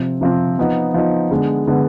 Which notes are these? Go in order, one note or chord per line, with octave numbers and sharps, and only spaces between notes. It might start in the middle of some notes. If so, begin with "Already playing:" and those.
Already playing: C3 F3 C4
C3 F3 C4
F3 B3 D#4
F3 B3 D#4
D3 G#3 B3
D3 G#3 B3